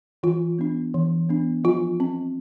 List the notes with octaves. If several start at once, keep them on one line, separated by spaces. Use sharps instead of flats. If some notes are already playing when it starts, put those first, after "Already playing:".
E3 F4
B3 D4
E3
B3 D4
F3 F4
C4